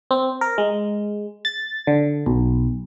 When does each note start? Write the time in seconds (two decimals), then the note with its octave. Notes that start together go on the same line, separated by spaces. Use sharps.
0.11 C4
0.41 A#4
0.58 G#3
1.45 A6
1.87 D3
2.26 B1